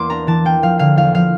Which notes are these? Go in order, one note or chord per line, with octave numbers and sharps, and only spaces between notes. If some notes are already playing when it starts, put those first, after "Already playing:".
Already playing: E2 A#3 C6 D6
D4 A#5
E3 A5
A#3 G5
F3 F5
D3 F5
E2 F5
F3 F5